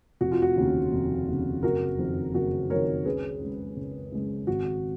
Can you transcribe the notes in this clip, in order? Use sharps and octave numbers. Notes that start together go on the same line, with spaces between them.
F1 F#4
F4
F#4
D#2 C#3
F1
D#2 C#3
F#1 F#4 A#4
F2 D#3
F#1 F#4 A#4
F2 D#3 A#4 C#5
C#2 G#4 B4
C#3 G#3
C#2
C#3 G#3
G#1 F#4